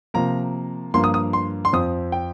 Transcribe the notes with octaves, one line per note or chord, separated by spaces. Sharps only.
C3 F3 A#3 A#5
G2 F3 A#3 C6
D#6
D#6
C6
C6
F2 F3 C4 D#6
G5